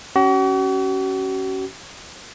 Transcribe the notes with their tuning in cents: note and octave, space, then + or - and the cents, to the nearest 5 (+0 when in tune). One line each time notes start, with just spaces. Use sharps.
C#4 +0 F#4 +40